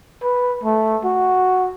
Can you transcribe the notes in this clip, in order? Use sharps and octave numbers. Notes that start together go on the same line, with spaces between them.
B4
A3
F#4